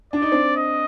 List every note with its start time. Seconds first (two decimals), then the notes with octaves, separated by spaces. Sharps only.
0.13 D4 D5
0.22 D#4
0.32 C4 D4
0.56 D#5